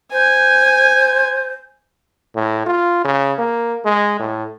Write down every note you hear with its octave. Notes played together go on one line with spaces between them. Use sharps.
C5 G#5
A2
F4
C#3
A#3
G#3
A2